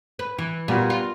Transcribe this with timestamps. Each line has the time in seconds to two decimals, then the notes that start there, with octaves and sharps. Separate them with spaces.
0.19 B4
0.38 E3
0.68 A#2 G3 B3 F#4
0.90 F4